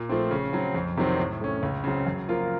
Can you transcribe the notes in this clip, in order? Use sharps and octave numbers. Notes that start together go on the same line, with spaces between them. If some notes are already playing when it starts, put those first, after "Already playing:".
Already playing: A#2
F3 A3 C4
C#3
F#3 C4
F2
C3 D#3 F#3 C4
A2
A3 C#4
C#2
C#3 F#3 C4
F#2
F3 A#3 F4 A#4